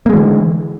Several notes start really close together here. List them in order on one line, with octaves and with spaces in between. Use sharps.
A#3 G#3 E3 D3